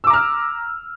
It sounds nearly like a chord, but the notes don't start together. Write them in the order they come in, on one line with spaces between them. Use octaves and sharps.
E6 D6 A#5 F6